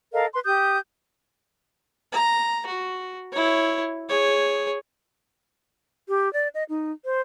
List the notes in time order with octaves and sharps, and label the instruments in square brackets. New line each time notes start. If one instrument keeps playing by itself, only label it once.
[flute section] A4 A#4 D#5 F5
B4 C6
G4 D#6 G6
[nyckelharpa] A#5
F#4
E4 C#5
G#4 C#5
[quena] G4
D5
D#5
D#4
C5